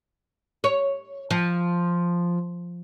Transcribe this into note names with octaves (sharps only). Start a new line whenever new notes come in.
C#5
F3